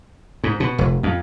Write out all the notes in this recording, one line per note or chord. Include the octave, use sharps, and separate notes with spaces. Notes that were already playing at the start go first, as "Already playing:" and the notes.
G#2
B2
F1
F2